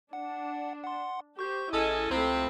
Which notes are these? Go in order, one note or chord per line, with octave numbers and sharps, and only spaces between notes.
D4 F#5
F#5 C6
G4 C5 C#6 G6
A1 C#4 E4 G#4 A4 D#5 G#5
C#2 C3 F3 A3 C4 B5